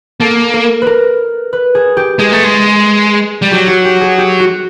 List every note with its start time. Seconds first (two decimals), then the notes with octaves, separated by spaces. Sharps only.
0.20 A#3 A4
0.53 A#4
0.82 A#4 B4
1.53 B4
1.75 G#4
1.97 G4
2.19 G#3 G#4
2.32 A3
2.44 G#3
3.42 G3
3.51 F#3 G4
3.67 F#4
3.85 G4
4.01 G#4
4.18 G4
4.40 F#4